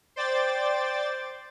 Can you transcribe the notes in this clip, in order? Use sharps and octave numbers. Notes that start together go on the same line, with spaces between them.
C5 D5 G5 A6